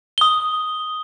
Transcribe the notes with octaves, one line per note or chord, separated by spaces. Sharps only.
D#6 G7